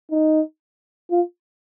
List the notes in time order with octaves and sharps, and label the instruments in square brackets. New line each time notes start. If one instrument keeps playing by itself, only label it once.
[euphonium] D#4
F4